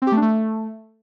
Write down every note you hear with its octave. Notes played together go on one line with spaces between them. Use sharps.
C4
G4
A3
D4
A3